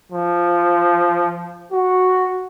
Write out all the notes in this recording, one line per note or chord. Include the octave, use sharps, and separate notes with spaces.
F3
F#4